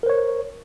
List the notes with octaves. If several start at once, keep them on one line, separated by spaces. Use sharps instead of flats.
A#4 C5 C#5